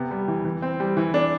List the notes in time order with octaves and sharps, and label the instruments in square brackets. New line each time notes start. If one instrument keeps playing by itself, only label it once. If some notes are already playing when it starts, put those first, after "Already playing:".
Already playing: [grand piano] C3 B3
G3
E3
E3
C4
G3
E3
D4